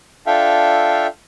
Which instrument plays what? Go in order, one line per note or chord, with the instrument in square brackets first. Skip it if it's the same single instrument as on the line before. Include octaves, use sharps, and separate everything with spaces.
[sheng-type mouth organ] D4 F4 A4 E5 F5 G5